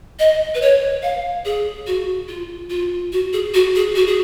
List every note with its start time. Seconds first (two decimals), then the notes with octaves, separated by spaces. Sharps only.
0.19 D#5
0.55 B4
0.61 C#5
1.03 F5
1.45 G#4
1.87 F#4
2.28 F4
2.70 F4
3.13 F#4
3.33 G#4
3.54 F#4
3.75 G#4
3.96 F#4
4.07 G#4